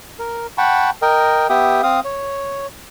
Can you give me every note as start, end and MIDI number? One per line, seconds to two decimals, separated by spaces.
0.19 0.47 70
0.58 0.90 78
0.58 0.90 79
0.58 0.90 81
0.58 0.90 83
0.58 0.90 85
1.02 1.47 70
1.02 1.47 75
1.02 1.47 79
1.50 1.81 59
1.50 1.81 67
1.50 1.81 76
1.50 1.81 79
1.50 1.81 87
1.83 2.00 60
1.83 2.00 77
1.83 2.00 87
2.05 2.67 73